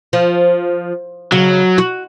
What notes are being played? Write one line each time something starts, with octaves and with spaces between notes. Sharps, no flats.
F3
C#3 F#3
F#4